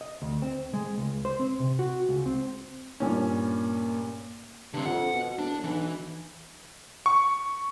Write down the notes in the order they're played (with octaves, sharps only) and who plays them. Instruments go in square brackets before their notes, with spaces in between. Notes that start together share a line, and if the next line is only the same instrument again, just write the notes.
[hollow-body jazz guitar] D#5
D2
C4
G#3
C#2
C5
C4
C3
F#4
C#2
C4
[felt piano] G2 A#2 C#4
[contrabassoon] G2 [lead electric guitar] D3 C4
[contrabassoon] F2 [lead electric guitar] F#5
[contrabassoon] B2
[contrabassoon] E1 [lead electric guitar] D4
[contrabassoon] B1 [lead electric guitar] E3
[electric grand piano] C#6